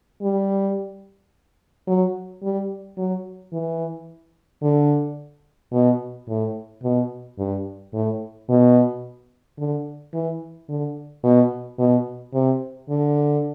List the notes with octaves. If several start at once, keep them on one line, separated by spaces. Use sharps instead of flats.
G3
F#3
G3
F#3
E3
D3
B2
A2
B2
G2
A2
B2
D3
E3
D3
B2
B2
C3
D3